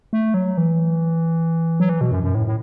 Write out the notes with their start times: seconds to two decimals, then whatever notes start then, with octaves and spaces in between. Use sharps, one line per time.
0.13 A3
0.34 F#3
0.57 E3
1.80 F#3
1.89 E3
2.01 B2
2.11 F#2
2.24 F#2
2.35 A2
2.47 A2